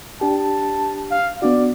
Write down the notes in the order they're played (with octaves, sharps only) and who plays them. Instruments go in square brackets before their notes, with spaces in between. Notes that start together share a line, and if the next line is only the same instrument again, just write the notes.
[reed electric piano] D4 G4 [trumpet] A5
[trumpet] F5
[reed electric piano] B3 D4 F#4 [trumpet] D5